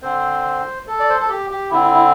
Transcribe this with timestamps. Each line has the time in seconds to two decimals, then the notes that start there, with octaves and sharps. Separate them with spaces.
0.02 D3 C4 C5
0.87 A4
1.00 D5
1.09 C5
1.20 A4
1.29 G4
1.51 G4
1.71 D3 C4 E4
1.82 E4
1.93 E4